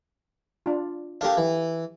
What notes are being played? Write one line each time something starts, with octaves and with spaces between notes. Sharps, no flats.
D4 F4
A#3 D4 G4 A4 F5
E3